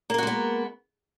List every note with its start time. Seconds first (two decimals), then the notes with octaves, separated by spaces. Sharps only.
0.10 A#3
0.14 A#4
0.18 F#4
0.23 G#3
0.27 B3